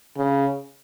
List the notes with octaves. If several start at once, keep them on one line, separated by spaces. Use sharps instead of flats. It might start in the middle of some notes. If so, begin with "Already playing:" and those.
C#3